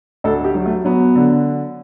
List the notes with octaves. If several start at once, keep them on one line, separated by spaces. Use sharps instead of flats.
D2 A4
G4
F#3
A3
F#3 B3
D3